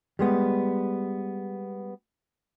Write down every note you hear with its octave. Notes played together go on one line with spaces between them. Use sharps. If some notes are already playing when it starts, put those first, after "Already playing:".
G3 G#3 B3